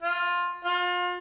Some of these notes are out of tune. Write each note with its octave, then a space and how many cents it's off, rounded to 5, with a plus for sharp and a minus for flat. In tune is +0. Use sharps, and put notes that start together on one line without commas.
F4 +15
F4 +35